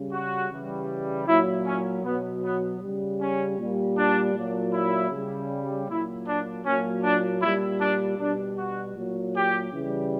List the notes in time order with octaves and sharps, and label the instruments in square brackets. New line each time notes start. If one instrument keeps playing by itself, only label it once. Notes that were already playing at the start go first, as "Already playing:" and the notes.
Already playing: [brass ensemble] C#3 G3
F#4
C#3 E3 G3
A#2 F#3 E4
C#4
B2 F#3 B3
B3
C#3 G3
C#4
A#2 G3
D4
A#2 F#3
E4
C#3 G3
A#2 F#3 E4
D4
A#2 F#3 C#4
D4
A#2 G3 E4
D4
B2 G3 D4
F#4
A#2 F#3
G4
C#3 E3 G3